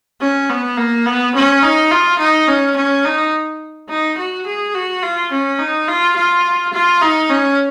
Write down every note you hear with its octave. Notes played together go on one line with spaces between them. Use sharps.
C#4
B3
A#3
B3
C#4
D#4
F4
D#4
C#4
C#4
D#4
D#4
F#4
G#4
F#4
F4
C#4
D#4
F4
F4
F4
D#4
C#4